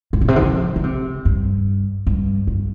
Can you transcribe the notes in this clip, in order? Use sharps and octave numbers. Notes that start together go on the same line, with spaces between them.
G2
A#2
C3
D3
F3
D3
C3
G2
G2
G2